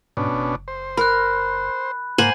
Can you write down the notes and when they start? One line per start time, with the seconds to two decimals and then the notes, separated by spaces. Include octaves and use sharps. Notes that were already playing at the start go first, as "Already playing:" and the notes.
0.17 G#2 B2 C#4 D4
0.33 F#1
0.68 C5
0.97 A#4 B5 F#6
2.18 G#2 A#3 C5 F#5 G#5